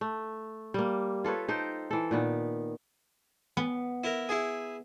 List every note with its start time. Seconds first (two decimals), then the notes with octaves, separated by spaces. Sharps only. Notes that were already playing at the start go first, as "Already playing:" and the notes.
0.01 A3
0.74 G3 A#3
1.24 F4 A4 B4 C#5
1.48 D#4 A4 C5 G5
1.91 E3 A4
2.11 A#2 D#3 B3
3.57 B3
4.04 E4 A#4
4.29 E4 G#4